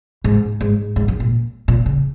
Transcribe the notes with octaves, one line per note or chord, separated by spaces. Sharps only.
G#2
G#2
G#2
F#2
A#2
A#2
C#3